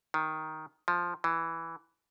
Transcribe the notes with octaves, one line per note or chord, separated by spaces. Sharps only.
D#3
F3
E3